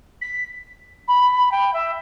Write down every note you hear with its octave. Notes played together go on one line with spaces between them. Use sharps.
B6
B5
G5
E5